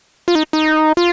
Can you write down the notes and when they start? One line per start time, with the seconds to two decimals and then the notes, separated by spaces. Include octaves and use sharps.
0.28 F4
0.35 D#4
0.53 D#4
0.97 F4